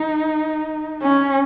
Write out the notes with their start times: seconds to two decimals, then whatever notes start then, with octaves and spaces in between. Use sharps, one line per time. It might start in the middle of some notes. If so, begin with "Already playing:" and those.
Already playing: D#4
1.02 C#4